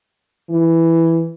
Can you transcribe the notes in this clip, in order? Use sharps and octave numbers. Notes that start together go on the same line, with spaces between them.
E3